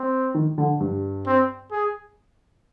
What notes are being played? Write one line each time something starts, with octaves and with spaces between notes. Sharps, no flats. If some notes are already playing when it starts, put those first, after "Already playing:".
Already playing: C4
D#3
D3
G2
C4
G#4